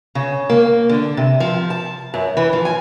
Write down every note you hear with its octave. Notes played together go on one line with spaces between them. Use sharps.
C#3
A#3
D3
C3
F3
A5
F#2
E3
F3
G#5